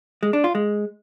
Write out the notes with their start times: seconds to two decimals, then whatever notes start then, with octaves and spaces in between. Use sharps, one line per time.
0.23 G#3
0.33 D4
0.44 F4
0.55 G#3